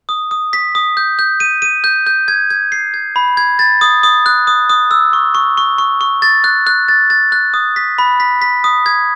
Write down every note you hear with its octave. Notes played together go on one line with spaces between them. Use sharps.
D#6
D#6
B6
D#6
G6
G6
D#7
D#7
G6
G6
G#6
G#6
C7
G#6
B5
G#6
A6
D#6
D#6
F#6
D#6
D#6
E6
C#6
C#6
C#6
C#6
C#6
A6
F#6
F#6
A6
A6
F#6
D#6
B6
B5
B6
B6
D#6
G#6